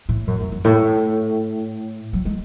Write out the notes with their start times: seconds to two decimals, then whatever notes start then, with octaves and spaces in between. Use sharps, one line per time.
0.09 A2
0.27 F#2
0.40 F#2
0.52 F#2
0.64 A2
2.13 F#3
2.25 G#3